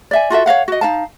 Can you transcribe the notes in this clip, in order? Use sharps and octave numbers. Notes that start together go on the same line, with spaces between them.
D5 E5 G#5
F4 F#4 A4 E5
C#5 D#5 F5 F#5
F#4 D#5
D#4 F5 A5